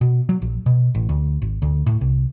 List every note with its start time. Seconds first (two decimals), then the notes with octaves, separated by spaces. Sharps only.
0.01 B2
0.29 F#3
0.42 A#1
0.66 B2
0.95 A1
1.09 D2
1.42 G#1
1.62 D2
1.86 A2
2.01 C2